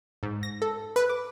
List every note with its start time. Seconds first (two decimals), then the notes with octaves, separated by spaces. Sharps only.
0.23 G#2
0.43 A#6
0.62 A4
0.96 B4
1.10 D6